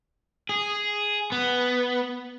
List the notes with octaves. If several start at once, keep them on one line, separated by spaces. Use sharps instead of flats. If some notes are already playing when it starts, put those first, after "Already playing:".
G#4
B3